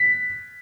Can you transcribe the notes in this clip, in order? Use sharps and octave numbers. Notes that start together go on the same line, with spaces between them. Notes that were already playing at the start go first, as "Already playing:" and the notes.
Already playing: B6